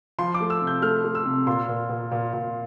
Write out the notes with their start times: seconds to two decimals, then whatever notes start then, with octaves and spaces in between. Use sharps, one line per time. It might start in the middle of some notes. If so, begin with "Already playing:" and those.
0.19 F3 C6
0.34 D6
0.40 A3
0.50 E6
0.62 C3
0.67 G6
0.82 A3 F6
1.04 A3
1.15 E6
1.25 C3
1.47 A#2 C6
1.68 A#2
1.89 A#2
2.12 A#2
2.33 A#2